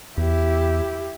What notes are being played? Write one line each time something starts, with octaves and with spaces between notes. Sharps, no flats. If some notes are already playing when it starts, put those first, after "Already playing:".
E2 E4 G4